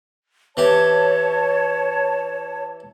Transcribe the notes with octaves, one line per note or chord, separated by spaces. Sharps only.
E3 G4 C#5 A5